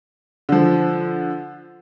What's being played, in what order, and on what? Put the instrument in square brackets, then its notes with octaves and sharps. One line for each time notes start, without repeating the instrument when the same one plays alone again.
[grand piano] D3 F3